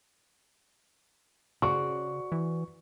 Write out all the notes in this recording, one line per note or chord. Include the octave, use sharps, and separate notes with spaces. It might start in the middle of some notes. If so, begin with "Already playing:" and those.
C#3 F#4 C5 D5 C#6
E3